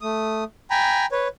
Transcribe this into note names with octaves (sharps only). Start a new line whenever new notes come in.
A3 D#6
G5 G#5 A#5 B5
B4 C#5